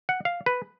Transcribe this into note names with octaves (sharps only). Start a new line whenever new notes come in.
F#5
F5
B4